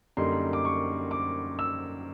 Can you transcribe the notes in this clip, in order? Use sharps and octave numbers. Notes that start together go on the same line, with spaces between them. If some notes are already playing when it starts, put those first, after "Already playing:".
F#2 D3 G3 A#3 D#4 C6
D6
C#6
D6
E6